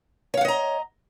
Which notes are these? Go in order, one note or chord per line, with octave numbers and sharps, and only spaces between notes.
C#5 D#5 F5 F#5 A#5